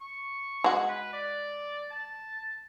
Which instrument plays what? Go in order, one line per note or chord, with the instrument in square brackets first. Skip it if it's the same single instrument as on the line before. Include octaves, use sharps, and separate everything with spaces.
[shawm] C#6
[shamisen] G#3 F#4
[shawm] B4
D5
A5